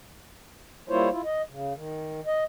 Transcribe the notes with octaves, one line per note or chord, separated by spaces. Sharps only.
G3 A#3 E4 F4 C5 C#5
E4 F4
D#5
C#3
D#3
D#5